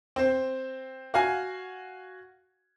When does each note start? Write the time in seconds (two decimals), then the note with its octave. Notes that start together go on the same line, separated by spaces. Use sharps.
0.16 C4 C5
1.14 F#4 F5 G#5